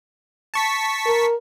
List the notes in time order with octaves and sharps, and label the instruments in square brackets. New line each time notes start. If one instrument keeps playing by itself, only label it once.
[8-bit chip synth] A5 C#6 B6
[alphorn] A#4